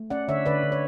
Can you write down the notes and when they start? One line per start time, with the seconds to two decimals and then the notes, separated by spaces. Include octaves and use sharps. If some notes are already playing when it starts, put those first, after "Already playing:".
Already playing: A3
0.10 C#4 D5 F#5
0.28 D3 C#5 E5
0.46 D3 B4 D5
0.63 D3
0.72 C#5